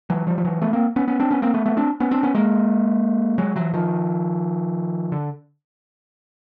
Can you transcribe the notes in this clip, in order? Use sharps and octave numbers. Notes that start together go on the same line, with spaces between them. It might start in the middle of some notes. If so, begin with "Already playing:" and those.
E3 F#3
F3 G3
F3
E3 F#3
A3 B3
A#3 C4
B3 C#4
B3 C#4
C4 D4
B3 C#4
A#3 C4
A3 B3
A3 B3
C4 D4
B3 C#4
C4 D4
B3 C#4
G#3 A#3
F#3 G#3
E3 F#3
D#3 F3
D3